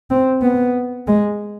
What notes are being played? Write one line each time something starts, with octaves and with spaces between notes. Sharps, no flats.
C4
B3
G#3